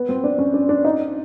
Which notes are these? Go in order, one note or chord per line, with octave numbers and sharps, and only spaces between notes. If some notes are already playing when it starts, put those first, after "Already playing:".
Already playing: B3
C4
D4
C#4
D4
D4
D#4